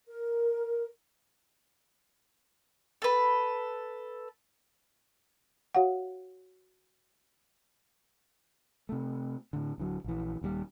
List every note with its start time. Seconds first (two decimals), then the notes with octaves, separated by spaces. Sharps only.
0.07 A#4
3.02 A4 B4
5.75 F#4 C#5 F5 F#5
8.89 C3 A3
9.53 A2 D3
9.78 D1 D3 F#3
10.04 A#1 E3
10.41 D#1 D#2 C3 G3